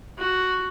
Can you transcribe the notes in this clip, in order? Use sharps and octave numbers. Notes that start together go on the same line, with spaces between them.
F#4